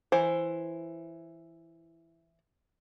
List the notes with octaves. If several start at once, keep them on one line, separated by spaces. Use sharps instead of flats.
E3 E4 C5